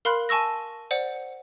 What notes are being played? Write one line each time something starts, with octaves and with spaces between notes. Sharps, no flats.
A#4 F5 B5 C6 F#6
G#5 A5 C#6 E6 A#6
C5 D5 F#5